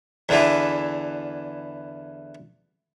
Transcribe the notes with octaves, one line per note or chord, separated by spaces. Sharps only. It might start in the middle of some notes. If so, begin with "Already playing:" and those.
E2 D3 E3